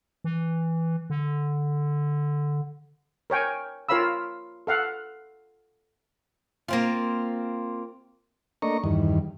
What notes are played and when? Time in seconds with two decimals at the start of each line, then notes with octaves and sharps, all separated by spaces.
0.24 E3
1.10 D3
3.30 A#4 C#5 G5 G#5
3.89 F4 A#4 C#5 F5 B5 E6
4.67 A4 F5 F#5
6.68 A#3 C4 F4
8.62 A3 A#3 D4 D#5 A#5 C#6
8.84 E2 G2 D#3